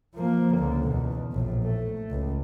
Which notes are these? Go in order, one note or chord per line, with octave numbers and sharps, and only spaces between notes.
F3 A#3
C#2 D3
E2 B2
A#1 A2
A3
C#2